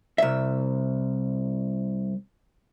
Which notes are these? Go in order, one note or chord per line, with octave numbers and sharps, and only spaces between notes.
C2 E5